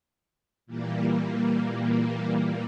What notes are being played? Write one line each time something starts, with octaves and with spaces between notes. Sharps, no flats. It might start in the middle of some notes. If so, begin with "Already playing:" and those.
A#2 E3 G3 A#3